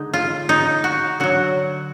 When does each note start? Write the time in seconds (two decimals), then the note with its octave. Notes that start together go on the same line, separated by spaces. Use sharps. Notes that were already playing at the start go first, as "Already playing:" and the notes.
Already playing: D3 G#3 D#4
0.14 F4
0.49 D#4
0.84 F#4
1.20 D3 F#3 F#4